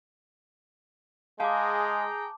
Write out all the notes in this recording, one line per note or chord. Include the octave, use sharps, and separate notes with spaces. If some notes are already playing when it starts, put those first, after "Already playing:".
G#3 G#4 F5 G5 A5 A#5 D6